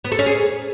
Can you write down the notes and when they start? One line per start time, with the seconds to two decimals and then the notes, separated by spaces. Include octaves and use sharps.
0.04 B3
0.12 A4
0.19 C#4
0.26 G#4